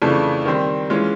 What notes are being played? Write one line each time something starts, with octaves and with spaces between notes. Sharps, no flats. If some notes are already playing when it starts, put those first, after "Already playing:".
F2 C#3 E3 A3 D4
D#3 G3 C4
E3 G#3 C#4 F4